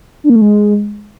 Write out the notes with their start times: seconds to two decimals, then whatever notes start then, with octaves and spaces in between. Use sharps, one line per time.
0.24 D4
0.30 A#3
0.36 A3
0.42 G#3